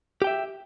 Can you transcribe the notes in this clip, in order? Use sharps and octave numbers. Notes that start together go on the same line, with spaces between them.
G4 E5 G5